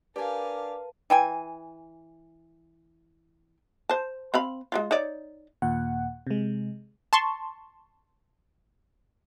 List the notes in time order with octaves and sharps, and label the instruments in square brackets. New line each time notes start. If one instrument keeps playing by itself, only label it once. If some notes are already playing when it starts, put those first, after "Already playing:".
[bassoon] D4 [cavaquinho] G4 G#5 [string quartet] A#4 F5 [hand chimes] B4 A5
[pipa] E3 G5 G#5
[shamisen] C5 A5
C4 F5 B5
G#3 E4 F4
D#4 C#5 D5
[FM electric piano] D#2 A#2 F#5
C3 G#3
[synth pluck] A5 C6 C#6